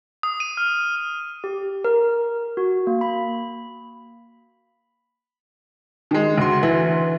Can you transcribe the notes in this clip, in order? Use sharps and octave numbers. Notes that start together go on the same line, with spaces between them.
D#6
D#7
F6
G4
A#4
F#4
A#3
B5
D#3 G#3
D2 F#4 C6
E3